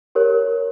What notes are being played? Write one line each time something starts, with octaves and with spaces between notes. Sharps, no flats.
G4 A#4 C#5